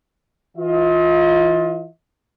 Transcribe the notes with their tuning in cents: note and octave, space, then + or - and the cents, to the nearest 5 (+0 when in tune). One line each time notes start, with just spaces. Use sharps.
E3 +0 F4 +15 D#5 +40